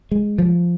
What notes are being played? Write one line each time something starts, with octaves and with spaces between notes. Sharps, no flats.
G#3
F3